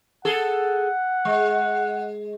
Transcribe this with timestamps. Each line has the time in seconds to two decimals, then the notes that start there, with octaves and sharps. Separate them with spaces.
0.25 G#4 A4 F#5
1.25 G#3